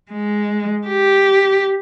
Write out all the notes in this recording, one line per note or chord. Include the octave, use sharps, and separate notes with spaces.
G#3
G4